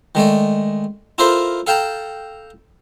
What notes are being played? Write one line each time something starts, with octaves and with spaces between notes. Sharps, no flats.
D#3 G#3 A3 D5
E4 F4 A4 A#4 C5 C6
A4 F5 G5 A5 A#5